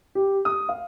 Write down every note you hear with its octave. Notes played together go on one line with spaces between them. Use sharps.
G4
D#6
F5